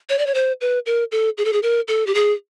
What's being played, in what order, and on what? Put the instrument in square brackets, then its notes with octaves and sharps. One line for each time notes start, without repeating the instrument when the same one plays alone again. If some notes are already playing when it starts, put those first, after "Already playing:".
[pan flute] C#5
D5
C#5
C5
B4
A#4
A4
G#4
A4
G#4
A#4
A4
G4
G#4